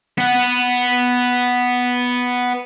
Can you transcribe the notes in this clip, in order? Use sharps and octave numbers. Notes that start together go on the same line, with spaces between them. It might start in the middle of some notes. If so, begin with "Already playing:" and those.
B3 F#5